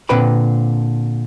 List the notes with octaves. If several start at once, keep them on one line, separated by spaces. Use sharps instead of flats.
A#2 D3 C4 B4 G5 B5